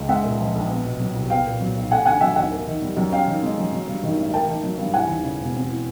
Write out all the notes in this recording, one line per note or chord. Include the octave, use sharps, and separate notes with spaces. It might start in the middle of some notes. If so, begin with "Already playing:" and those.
Already playing: C#2
G#3 E5 F#5
A#2
F3
A#1
B3
B2
F#3
C2
B3 F5 G5
A#2
F#3
B1
A3 F#5 G#5
D3 F#5 G#5
F#3 E5 F#5
D#2 E5 F#5
A#3
D#3
G3
F#2
C#4 F5 G5
D#3
G#3
F#2
F#3
G2
D#3
A1
A#3 G5 A5
D#3
F#3
G2
E3 F#5 G#5
D#2
C#3
E1
C4
E3